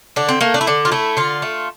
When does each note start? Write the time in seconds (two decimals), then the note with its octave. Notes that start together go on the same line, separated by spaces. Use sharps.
0.16 D3 D4
0.29 C4
0.41 A3 A#3
0.54 D4
0.61 E4
0.67 D3 D4
0.85 F4
0.92 A3 E4
1.17 D3 F4
1.42 A3